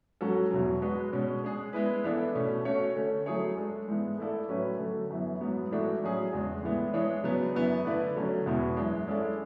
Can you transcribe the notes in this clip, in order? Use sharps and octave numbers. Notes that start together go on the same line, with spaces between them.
G#2 F#3 C#4 F#4 A4
E2 B2 F#3
G#3 D4 F#4 B4
B2 G#3 C#4
G#3 D4 G#4
G#3 B3 E4 B4
E3 B3 D4 A4 D5
B2 A3 C#4
A3 C#4 F#4 C#5
D3 A3 C#4
F#3 A3 E4 G#4 C#5
G#3 D4 A4
G#2 E3 G#3 B3
A3 E4 A4 D5
A2 F#3 C#4 F#4 B4
D3 F#3 A3
F#2 E3 B3
G#2 F#3 B3
G#2 E3 A3 D4 F#4
A2 F#3 C#4 G#4
E2 C#3 G#3 D4
A2 E3 G#3 B3
E3 G#3 D4 G#4 C#5
C#3 F#3 B3 D4
F#2 E3 B3
D3 A3 E4 B4 D5
D3 F#3 A3 C#4
E2 B2 G#3 B3 E4
F#2 E3 G#3 D4
G#3 C#4 E4 A4 D5